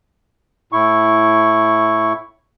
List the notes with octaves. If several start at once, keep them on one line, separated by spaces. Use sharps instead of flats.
A2 E4 C#6